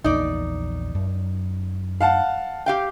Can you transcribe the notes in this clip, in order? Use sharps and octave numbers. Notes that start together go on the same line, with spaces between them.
A#1 E2 A#3 D#4 D5
F#2
F5 F#5 A5
G4 F5 G5